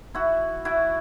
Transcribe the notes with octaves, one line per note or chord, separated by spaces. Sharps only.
E4 F#4
E4 F#4